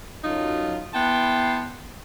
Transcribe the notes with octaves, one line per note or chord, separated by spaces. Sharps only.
F#2 F#3 D#4 F4 A4
B3 E4 G5 A5 C6